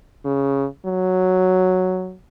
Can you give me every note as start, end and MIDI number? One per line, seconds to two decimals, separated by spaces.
0.25 0.66 49
0.85 2.14 54